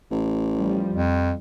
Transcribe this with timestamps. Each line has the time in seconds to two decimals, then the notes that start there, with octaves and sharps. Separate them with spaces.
0.11 A1
0.55 F3 G3
0.93 F2